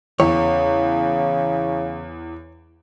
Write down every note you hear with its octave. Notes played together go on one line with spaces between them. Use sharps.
E2 C#3 C#5